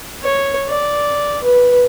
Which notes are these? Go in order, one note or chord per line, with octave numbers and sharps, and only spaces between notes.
C#5
D5
B4